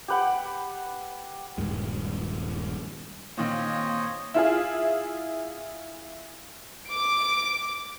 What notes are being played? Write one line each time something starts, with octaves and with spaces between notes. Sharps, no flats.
G4 B4 F#5 G5
D#1 B1 G2 G#3
A#2 D#3 C4 C5 C#5 D#5
E4 F4 G#4
D6 D7